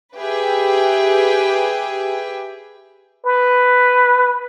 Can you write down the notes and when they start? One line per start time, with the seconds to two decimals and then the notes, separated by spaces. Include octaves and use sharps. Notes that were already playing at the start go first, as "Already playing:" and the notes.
0.15 G4 G#4 B4 E5 G5
3.26 B4